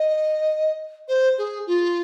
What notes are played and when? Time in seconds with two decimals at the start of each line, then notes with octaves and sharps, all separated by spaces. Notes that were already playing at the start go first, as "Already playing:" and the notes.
Already playing: D#5
1.08 C5
1.38 G#4
1.67 F4